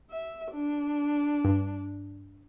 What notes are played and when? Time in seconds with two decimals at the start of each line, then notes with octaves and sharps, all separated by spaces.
0.11 E5
0.52 D4
1.45 G2